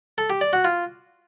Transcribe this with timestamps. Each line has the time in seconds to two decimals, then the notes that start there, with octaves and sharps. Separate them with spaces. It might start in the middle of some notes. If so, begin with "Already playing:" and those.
0.18 A4
0.30 G4
0.41 D5
0.53 F#4
0.65 F4